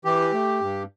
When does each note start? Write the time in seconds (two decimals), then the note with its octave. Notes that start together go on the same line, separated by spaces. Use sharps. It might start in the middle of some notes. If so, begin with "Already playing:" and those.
0.05 E3 G4
0.33 A3
0.61 G2